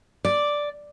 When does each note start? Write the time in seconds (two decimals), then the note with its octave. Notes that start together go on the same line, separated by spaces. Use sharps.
0.25 D5